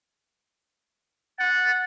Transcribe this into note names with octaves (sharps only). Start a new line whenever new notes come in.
F#5 A6